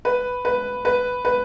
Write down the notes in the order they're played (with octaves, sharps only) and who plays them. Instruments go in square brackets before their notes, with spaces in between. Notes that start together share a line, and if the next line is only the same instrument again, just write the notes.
[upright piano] B4
B4
B4
B4